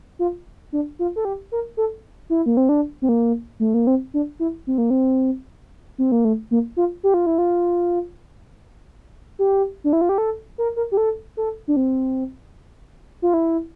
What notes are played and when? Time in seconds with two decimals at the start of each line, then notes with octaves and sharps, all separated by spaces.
0.19 F4
0.73 D4
0.99 F4
1.16 A4
1.25 G4
1.52 A#4
1.77 A4
2.30 E4
2.46 A#3
2.57 C4
2.69 D4
3.02 C4
3.09 A#3
3.60 A3
3.74 A#3
3.87 C4
4.14 D4
4.40 E4
4.67 C4
4.78 A#3
4.90 C4
5.98 C4
6.12 A#3
6.25 A3
6.51 A#3
6.77 F4
7.03 G4
7.14 F4
7.26 E4
7.38 F4
9.39 G4
9.84 D4
9.93 E4
10.01 F4
10.09 G4
10.18 A4
10.58 A#4
10.76 A#4
10.92 G4
10.97 A4
11.37 A4
11.68 D4
11.76 C4
13.22 F4
13.34 E4